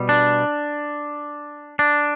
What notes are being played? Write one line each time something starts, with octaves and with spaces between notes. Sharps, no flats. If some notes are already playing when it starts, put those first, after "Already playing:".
Already playing: B2 G3
D4
D4